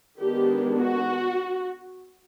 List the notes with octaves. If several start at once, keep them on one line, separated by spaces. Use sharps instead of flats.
D#3 G#3 B3 D4 G4
F#4